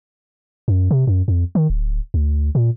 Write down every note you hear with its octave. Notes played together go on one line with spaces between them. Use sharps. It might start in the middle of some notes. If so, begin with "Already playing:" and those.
F#2
C3
F#2
F2
D#3
D1
D2
A#2